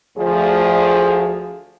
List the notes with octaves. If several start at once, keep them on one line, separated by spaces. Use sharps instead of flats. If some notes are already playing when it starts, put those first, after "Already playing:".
D2 F3 G#4